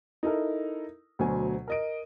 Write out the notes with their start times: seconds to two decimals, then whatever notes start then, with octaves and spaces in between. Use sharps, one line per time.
0.23 D#4 E4 A4 A#4
1.19 D2 B2 F#3 C5 G#5
1.68 A#4 D#5 D7